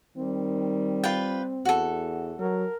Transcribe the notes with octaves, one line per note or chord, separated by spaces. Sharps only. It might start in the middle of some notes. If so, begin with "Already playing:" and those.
D#3 G3 C4
F4 B4 G5
E2 F#4 A4
F#3 A#4